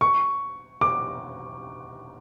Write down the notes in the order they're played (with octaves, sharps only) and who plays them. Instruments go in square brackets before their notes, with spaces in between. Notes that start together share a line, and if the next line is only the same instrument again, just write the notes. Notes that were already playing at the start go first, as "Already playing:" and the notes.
[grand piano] C#6
D6